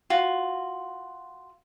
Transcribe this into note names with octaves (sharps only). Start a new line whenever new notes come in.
F4 F#4